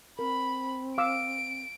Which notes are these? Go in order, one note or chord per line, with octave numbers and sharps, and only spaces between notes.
C4 A#4 B5
F5 D6 E6 D7